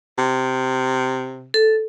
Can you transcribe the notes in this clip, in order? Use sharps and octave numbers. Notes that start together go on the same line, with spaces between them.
C3
A4